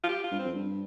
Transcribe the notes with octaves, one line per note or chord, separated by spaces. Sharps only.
F4
G4
F4
G2
C4
F2
G2